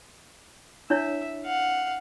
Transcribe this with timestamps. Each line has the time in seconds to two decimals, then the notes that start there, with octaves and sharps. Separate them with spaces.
0.90 D4 E4 C#5 E5
1.45 F5 F#5